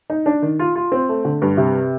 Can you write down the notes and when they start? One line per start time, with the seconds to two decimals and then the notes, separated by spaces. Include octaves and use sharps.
0.10 D#4
0.26 D4
0.42 D#3
0.59 F4
0.76 F4
0.92 C4
1.09 A3
1.25 D3
1.42 G2
1.57 C3